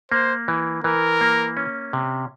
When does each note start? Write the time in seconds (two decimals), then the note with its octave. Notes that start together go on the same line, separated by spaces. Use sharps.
0.12 A#3 C5
0.48 E3
0.84 E3 A#4
1.21 A#3
1.57 C#4
1.93 C3